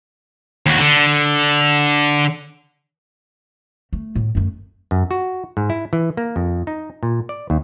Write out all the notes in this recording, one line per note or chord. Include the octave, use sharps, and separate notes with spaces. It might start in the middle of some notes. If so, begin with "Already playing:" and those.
D#2 F#4
D3
A3
A2
F#2 A3
F#2
F#4
G#2
E4
E3
A#3
F2
D#4
A#2
D5
D#2